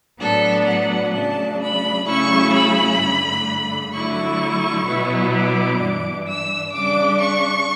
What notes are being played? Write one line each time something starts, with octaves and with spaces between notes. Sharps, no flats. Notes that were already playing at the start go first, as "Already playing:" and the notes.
A2 F#3 B3 D4 A4
F#5
C#3 F#3 A3 D4 A5
B5
C#3 F#3 A3 C#4 E4 C#6
B5
G2 D3 A3
D3 F#3 A3 E4 C#6
B2 F#3 B3 E4
D6
G2 E3 G3 D4
E6
C#3 G3 D4 D6
C#6